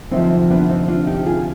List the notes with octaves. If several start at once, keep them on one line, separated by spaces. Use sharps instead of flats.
D2 C3 F3 C4 D#4
B3 D4
C4 D#4
D4 F4
D#4 G4
F4 G#4